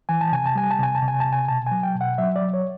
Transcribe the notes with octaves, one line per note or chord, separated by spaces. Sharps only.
E3 G#5
A5
C3 G#5
A5
G3 G#5
A5
C3 G#5
A5
C3
G#5
C3 A5
G#5
B2 A5
F#3 G#5
G5
B2
F#5
F#3 E5
D5
F#3
C#5